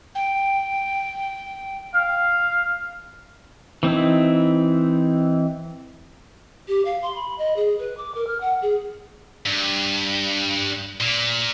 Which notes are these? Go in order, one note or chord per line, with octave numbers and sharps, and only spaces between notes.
G5
F5
E3 C4 D#4 E4
G4
F5
C6
B5
D#5
G#4
B4
D6
A#4
F6
F#5
G#4
G2
A#2